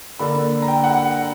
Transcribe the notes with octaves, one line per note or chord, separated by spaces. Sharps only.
D3 A#3 D4 B5
A#5
G5
F#5